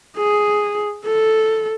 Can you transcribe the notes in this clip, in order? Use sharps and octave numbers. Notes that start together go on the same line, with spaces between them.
G#4
A4